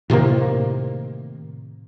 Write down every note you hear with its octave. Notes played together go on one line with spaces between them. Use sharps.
A2 C3 D#3 A#3